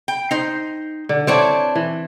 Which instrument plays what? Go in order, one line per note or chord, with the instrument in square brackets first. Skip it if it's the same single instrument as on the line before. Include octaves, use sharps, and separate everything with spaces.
[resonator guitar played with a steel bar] G5
D#4 C5
[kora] D3
[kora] C4 E4 [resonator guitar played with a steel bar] D4 C#5 D5
[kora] E3